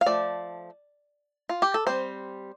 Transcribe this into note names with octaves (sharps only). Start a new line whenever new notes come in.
F5
F3 A3 D5
F4
G4
A4
G3 C4 C5